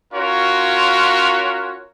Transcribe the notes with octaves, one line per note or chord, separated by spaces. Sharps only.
C#4 F4 F#4 A#4 C#5